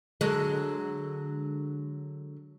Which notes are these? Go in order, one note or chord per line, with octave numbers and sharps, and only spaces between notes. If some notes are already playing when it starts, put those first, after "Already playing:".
D3 F#3 G#3